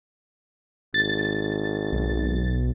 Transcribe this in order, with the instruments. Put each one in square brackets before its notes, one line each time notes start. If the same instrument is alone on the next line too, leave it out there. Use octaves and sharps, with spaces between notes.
[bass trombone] G#1 [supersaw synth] A6
[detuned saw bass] B1